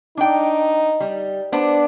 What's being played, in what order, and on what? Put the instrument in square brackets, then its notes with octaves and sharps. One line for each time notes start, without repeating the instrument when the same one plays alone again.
[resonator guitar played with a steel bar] D4 G5 [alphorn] D#4
[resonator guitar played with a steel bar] G3
[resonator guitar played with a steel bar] B3 D4 [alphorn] C5